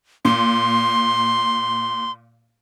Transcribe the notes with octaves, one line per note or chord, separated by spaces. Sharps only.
A#2 C6